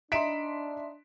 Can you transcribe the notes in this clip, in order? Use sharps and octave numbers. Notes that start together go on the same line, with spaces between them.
D4 D#4 E5 B5 C6 B6 D7 E7